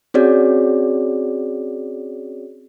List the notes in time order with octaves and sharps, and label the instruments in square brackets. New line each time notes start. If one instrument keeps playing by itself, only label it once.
[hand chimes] C4 C#4 F#4 G#4 C#5 D5